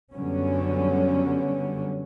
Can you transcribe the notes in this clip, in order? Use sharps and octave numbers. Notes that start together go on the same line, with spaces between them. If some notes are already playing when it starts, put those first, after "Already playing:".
F#2 D3 F#3 G3 B3 C#4